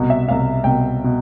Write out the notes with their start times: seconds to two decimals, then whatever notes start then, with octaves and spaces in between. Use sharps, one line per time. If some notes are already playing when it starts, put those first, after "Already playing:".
Already playing: C2 B2
0.10 E5
0.28 C2 B2 F5
0.64 C2 B2 G5
1.04 B2